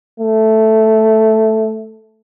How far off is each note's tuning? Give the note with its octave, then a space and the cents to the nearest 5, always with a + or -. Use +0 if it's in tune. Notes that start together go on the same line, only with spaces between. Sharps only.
A3 +0